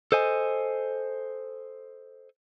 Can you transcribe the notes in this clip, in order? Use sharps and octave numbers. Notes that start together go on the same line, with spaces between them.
A4 C5 D#5 G#5